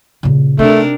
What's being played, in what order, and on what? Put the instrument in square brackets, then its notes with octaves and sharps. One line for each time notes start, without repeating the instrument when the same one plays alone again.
[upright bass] A#2 C#3
[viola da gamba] C3 D4 A#4 [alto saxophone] A3 [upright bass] D#4